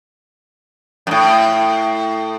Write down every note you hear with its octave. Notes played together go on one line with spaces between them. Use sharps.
F#2 A2